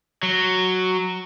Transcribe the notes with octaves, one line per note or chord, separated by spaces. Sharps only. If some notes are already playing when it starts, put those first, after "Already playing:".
F#3